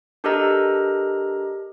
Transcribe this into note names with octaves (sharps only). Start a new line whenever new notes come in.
D4 G4 A4 A#4 D#5 A#5